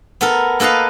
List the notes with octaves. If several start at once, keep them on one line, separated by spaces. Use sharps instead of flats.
B3 A4 A#4
A#3 A4 B4 D#5 F5